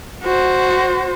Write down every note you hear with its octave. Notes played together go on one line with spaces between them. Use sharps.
F#4 C5